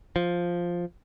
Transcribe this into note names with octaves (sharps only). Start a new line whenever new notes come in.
F3